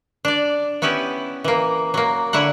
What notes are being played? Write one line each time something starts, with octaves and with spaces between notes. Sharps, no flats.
D4 D5
B3 C#4 E4 G4 B4
E3 A#3
F#3 A#3
D3 E4 C#5 F#5